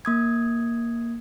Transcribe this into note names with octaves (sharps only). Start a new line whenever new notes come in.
A#3 D#6 G#6